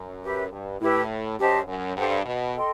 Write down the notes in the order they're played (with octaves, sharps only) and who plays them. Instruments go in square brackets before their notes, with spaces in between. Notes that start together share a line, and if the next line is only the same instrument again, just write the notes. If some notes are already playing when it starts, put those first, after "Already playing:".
Already playing: [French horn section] F#2
[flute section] G4 B4 E5
[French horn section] G2
[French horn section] A2 [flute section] E4 G4 B4
[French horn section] F#2 [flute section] G4 C5 D#5 A5
[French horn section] F#2
[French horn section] G2 [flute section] A4 C5 F#5
[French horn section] B2
[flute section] A4 D#5 G5 C6